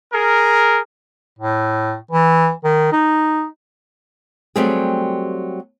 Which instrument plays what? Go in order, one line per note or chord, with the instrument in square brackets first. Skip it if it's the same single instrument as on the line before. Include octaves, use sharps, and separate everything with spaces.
[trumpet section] G#4 A#4
[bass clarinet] A2
E3
D#3
D#4
[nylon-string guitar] F#3 G3 A3 C4 G4 G#4